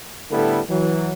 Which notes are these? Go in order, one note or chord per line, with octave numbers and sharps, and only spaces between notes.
A2 D3 G3 B3 E4 A4
E3 F#3